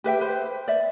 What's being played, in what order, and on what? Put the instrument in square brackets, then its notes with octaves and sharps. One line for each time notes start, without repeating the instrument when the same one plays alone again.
[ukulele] G4 B4 E5 G5
B4 C5
D5 E5